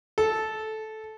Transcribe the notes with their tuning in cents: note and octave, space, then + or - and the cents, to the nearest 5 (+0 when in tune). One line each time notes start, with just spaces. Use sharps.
A4 -15